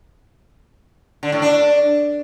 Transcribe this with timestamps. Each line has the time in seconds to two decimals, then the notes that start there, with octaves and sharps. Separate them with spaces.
1.23 D3
1.32 A2
1.42 D4